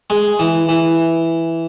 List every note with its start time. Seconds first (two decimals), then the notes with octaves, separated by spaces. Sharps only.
0.10 G#3
0.39 E3
0.69 E3